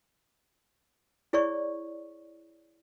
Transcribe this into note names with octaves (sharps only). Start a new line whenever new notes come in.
E4 G#4 C#5 D5 C#6